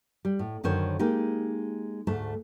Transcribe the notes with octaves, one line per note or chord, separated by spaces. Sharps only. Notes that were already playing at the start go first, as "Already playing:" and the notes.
G3
A2
F#2 D3 D#3 C5 C#5
G#3 A#3 D#4 G4
D2 G#2 A3 A5